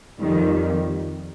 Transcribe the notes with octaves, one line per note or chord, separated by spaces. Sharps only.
F2 D#3 G3